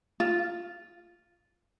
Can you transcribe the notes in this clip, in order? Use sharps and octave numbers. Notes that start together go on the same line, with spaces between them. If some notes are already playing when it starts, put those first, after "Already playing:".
F4